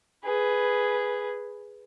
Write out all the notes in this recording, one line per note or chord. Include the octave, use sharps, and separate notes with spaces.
G#4 B4